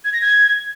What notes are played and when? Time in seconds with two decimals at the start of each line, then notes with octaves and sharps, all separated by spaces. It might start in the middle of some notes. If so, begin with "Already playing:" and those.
0.05 G#6
0.13 A#6
0.22 G#6